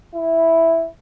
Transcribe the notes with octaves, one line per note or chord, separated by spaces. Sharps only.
E4